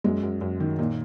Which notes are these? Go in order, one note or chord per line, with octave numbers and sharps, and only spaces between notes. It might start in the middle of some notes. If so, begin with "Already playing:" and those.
F#2 G#3
F#2
F#2
D#3
A#2 D#4